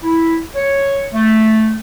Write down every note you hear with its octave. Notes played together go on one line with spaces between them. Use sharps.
E4
C#5
A3